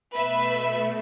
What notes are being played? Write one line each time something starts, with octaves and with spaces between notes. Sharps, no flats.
B2 A3 B4 E5